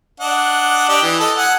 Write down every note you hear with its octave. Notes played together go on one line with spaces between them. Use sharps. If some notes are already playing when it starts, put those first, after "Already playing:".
D4 D#5 F#5
D4 G4 D#5
E3
A4 D#5
F#5 G#5